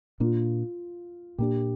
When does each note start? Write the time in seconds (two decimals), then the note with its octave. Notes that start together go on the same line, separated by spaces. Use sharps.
0.20 A#2 A#3 D4 F4
1.38 A#2 A#3 D4 G4